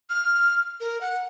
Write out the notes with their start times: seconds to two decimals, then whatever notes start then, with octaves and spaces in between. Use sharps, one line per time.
0.10 F6
0.80 A#4
1.01 F#5